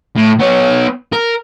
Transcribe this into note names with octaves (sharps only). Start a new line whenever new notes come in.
A2
B3 C#5
A#4